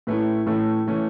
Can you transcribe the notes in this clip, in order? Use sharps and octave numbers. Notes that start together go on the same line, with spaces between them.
A2 A3 C#4 E4 B4
A2 E3 A3 C#4 A4
E3 A3 C#4